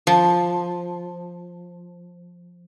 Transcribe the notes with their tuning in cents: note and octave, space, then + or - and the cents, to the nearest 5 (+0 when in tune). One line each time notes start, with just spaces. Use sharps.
F3 +5